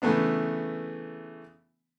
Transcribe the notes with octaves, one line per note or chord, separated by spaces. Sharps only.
C#3 E3 A3 B3 D4